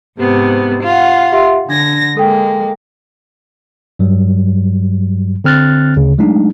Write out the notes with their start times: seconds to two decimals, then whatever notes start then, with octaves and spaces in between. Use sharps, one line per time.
0.19 G#2 C3 B3
0.83 F4 F5 F#5
1.32 G4 E5 C6
1.69 D3 D4 G#6 A#6
2.17 G#3 A#3 A4 G5
3.99 G2 F#3 G3
5.44 D3 C4 F6 F#6 A6
5.96 D2 C#3
6.18 F#3 G#3 A3 D4 D#4